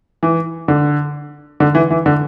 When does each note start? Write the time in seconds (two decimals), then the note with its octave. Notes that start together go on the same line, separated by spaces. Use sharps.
0.23 E3
0.68 D3
1.60 D3
1.75 E3
1.90 E3
2.06 D3